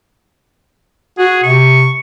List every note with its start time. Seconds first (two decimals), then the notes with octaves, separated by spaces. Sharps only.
1.18 F#4 G#4
1.43 C3 C#6